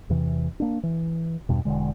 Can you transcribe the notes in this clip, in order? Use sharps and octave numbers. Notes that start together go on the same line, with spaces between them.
E2 C3 E3
A#3 D4
E3
E2 G2 B2
E1 D3 G#3